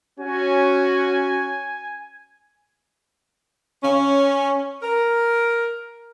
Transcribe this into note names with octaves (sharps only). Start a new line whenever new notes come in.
C#4 F#4 G#5
C#4
A#4